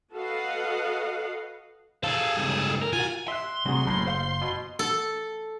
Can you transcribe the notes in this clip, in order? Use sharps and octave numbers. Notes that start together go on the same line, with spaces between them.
F#4 A4 B4 D#5 F5 F#5
G#4 A4 F5
C#2 G2
A#4
F4 F#4 G#5
E5 C6 F#6
C3 G3 A3 F#4 G#4 A#5
F#1 A2 C#3 F#3
C5 F5
B2
A4